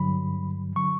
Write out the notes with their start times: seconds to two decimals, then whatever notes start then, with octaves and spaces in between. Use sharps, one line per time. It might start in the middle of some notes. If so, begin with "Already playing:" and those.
Already playing: G2 D3 F#3 B5
0.76 D3 F#3 C#6